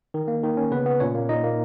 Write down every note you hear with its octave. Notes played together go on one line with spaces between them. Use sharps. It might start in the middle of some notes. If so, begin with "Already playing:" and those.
D#3
A#3
D#3
C#4
C#3 B3 B4
B3
A#2 C#4 C#5
A#3
A#2 D#4 D#5
A#3